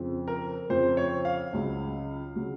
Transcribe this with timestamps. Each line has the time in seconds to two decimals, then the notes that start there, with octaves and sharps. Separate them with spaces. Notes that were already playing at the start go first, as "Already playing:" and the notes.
Already playing: F2 C#3 F3
0.28 A#4
0.70 F2 C#3 F3 C5
0.97 C#5
1.25 F5
1.53 C#2 C#3 F#3
2.36 C#3 F#3